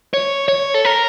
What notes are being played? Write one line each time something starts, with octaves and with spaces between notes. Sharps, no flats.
C#5
C#5
A4
A#4